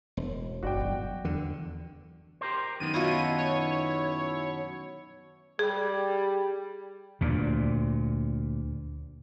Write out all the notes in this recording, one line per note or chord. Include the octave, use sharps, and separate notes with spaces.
E1
G1 F#4 D5 G5
G2 F#3
E2 D3
G4 A#4 C5
F#2 D#3 B3 D#7
B2 E4 F4 C#5 A#5
E4 C#5
G3 G#4
D2 A#2